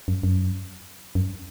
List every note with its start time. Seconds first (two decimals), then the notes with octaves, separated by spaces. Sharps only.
0.08 F#2
0.23 F#2
1.15 F#2